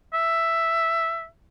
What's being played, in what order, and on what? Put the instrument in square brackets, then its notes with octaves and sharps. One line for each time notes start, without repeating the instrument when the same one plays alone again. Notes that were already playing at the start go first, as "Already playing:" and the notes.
[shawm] E5